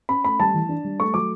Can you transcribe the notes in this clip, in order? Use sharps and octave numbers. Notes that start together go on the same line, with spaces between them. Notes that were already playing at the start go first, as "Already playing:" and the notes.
C#4 B5
A3 B5
G3 A5
E3
D4
G3
A3 C#6
F#3 D6